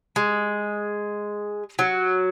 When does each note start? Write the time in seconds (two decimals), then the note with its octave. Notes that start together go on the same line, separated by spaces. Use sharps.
0.16 G#3
1.79 F#3